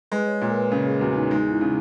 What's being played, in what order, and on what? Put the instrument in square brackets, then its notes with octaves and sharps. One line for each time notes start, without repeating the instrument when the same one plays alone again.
[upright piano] G#3 [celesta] B4 D#5
[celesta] C#5
D#5
[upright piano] A#2 [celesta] C#5
[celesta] A#4
B4
[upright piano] C#3
[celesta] G#4
[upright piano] E2 [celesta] F#4
[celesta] D#4
[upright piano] G#3 [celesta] D#4
[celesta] E4
[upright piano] C#3